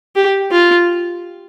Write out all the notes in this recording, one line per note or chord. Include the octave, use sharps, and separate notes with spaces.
G4
F4